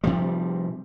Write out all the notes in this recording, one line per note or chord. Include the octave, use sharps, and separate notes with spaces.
C3 F3 G3